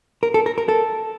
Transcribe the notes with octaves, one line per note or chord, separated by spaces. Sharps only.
A#4
A4
A#4
A#4
A4